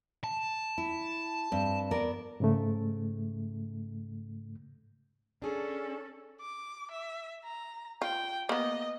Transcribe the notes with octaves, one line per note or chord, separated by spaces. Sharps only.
A5
E4
G2 C4
B3 A#4 D5
G#2 C#3 A3
C#4 D4 G#4 A4
D6
E5
A#5
F4 G5
A#3 B3 D#5